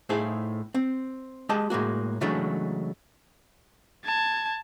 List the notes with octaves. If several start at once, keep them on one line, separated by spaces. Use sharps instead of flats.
A2 D#4 E4 G#4 C5 F5
C4
G#3 G4 D#5 A5
A2 G#3 A#3 F#4
C#3 E3 F#3 G#3 A3 D4
A5 G#6